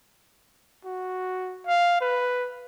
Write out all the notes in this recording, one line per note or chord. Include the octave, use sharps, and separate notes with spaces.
F#4
F5
B4